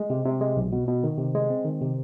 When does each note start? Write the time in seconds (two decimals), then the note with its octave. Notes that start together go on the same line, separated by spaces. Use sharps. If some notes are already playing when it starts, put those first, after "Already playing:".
Already playing: G#3
0.10 C3
0.25 C3
0.41 G#3
0.56 B1
0.72 B2
0.87 B2
1.04 D#3
1.18 C3
1.35 G#3
1.50 C4
1.65 D#3
1.81 C3